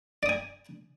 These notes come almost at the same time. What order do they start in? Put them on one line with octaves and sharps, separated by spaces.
D5 D#6 G#5